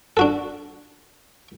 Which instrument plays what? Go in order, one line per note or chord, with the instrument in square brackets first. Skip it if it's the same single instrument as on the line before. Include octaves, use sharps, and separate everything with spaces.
[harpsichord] D4 F#4 A4